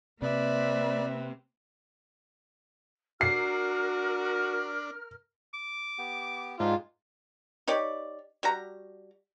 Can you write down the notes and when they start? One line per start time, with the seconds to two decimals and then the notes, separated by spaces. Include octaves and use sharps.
0.22 C3 A#3 C4 B4 D5 E5
3.21 D4 F#4 A#4 F6 C7
5.54 D6
5.98 B3 G4
6.60 G#2 D4 D#4 F4 G4
7.68 D#4 G4 C#5 D5
8.43 G3 F#4 A#5